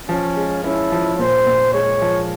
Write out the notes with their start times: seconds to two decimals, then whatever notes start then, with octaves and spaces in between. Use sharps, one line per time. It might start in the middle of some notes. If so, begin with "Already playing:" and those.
0.09 F3 C#4
0.37 G#3
0.64 C#4 E4
0.92 F3
1.19 A#2 C5
1.46 A#2
1.73 G#3 C#5
2.02 F3